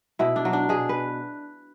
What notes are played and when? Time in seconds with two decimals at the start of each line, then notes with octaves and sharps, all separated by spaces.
0.19 B2 E4
0.36 D4
0.45 F#3
0.53 D4
0.69 B2 G#4
0.89 B4